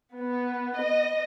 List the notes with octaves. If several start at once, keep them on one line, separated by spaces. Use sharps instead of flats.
B3
D#5